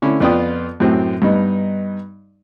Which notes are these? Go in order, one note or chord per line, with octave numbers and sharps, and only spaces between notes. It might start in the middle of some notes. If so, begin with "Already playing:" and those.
D3 C#4 E4
F2 B3 F4 D5 G5 D#6
F#2 A2 F#3 C4
G2 B3 D#4